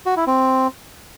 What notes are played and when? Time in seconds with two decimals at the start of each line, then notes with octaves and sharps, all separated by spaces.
0.06 F#4
0.17 E4
0.27 C4